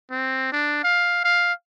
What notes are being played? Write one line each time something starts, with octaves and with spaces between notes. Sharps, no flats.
C4
D4
F5
F5